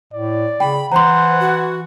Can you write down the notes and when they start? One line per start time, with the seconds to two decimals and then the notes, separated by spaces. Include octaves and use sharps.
0.13 A2 D5
0.60 C#3 G5 B5
0.92 E3 C5 F#5 A#5 C6
1.40 F#4